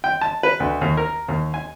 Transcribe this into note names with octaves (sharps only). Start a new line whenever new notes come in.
G5
A5
B4
D2
D#2
A#4
D#2
G#5